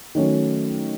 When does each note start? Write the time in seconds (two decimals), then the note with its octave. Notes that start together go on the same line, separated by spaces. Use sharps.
0.15 D#3 F#3 A3 C#4